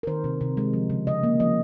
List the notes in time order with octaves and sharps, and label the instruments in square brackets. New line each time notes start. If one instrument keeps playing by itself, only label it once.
[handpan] A#4
D#3 C5
C3
C3
G#3
F3
C#3
C#3 D#5
A#3
F3 D#5